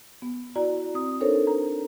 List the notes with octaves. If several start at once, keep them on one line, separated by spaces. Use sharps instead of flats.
B3
E4 F#4 D5 A#5
C4 D#6
D4 D#4 A4 A#4 C5 C#5
A#5